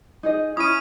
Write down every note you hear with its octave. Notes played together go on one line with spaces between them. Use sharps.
D#4 G#4 D#5
C#4 E4 B5 D#6 D#7